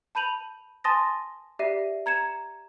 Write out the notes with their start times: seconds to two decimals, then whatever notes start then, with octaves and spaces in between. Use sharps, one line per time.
0.15 A5 B5 G6 D#7 F7 F#7
0.84 G#5 A5 C6 D#6 A6 A#6
1.59 G4 D5 E5 A#6 C7 D#7
2.06 A#5 G#6 C#7 E7